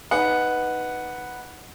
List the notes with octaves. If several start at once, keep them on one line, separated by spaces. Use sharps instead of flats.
D#4 B4 F#5